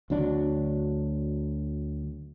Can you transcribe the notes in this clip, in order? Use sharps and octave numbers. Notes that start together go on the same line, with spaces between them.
D2 D3 F#3 D4